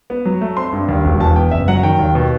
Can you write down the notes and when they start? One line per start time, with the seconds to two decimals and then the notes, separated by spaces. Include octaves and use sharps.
0.10 B3
0.25 F#3
0.41 A3
0.57 C4 C6
0.73 G2
0.89 D#2
1.05 E1
1.20 E2 A5
1.36 B3 G5
1.51 F#1 E5
1.68 F#3 F#5
1.83 D#3 G5
1.99 D#2
2.15 B2